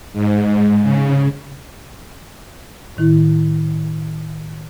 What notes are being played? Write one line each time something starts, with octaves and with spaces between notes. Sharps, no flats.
G#2
C#3
A2 D#3 E4